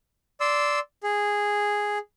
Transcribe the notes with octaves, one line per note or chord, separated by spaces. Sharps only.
D5 C6 E6
G#4